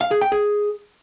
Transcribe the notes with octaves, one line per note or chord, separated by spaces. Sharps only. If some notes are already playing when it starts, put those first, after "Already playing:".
F5
G#4
G5
G#4